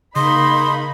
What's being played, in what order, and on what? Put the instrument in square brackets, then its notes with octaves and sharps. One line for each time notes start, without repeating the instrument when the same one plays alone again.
[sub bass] C#3 [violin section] A#3 D#4 B5 [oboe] D#5 [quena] C6